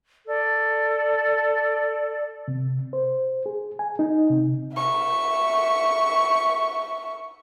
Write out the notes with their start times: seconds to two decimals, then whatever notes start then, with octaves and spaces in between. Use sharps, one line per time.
0.27 A4 D5
2.48 C3
2.93 C5
3.46 G#4
3.79 G#5
3.99 D#4
4.30 C3
4.75 E5 C#6